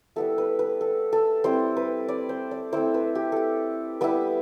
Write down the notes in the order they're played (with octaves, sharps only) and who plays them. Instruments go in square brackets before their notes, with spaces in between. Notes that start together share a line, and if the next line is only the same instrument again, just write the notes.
[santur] G3 B3 E4 A4
B4
B4
A4
A4
G3 C4 E4 C5
B4
D5
C5
D5
A3 C4 E4 C5
B4
G4
G4 A4
G3 B3 E4 B4